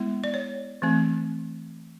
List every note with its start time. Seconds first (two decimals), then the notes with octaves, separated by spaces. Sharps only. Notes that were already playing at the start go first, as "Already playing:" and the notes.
Already playing: G#3 B3 E4
0.24 D5
0.34 C#5
0.82 E3 A3 C4